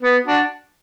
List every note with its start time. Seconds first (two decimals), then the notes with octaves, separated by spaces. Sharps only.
0.03 B3
0.27 D4 F#4